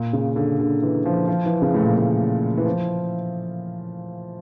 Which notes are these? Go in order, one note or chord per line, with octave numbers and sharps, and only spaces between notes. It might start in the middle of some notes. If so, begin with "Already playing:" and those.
Already playing: A#2
C#3
D3
D3
E3
F3
F3
E3
C#3
A2
A#2
A2
E3
F3